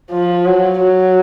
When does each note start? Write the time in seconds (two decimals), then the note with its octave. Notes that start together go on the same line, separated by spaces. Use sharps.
0.11 F3
0.46 F#3
0.80 F#3